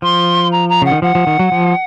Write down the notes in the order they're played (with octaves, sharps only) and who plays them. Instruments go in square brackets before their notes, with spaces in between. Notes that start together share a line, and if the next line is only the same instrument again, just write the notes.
[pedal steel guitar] F3 [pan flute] C6
[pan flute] A#5
A#5
[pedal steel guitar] C#3 [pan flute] F#5
[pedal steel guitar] D#3
[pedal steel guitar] F3 [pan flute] F#5
[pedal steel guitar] F3
D#3
F#3
F3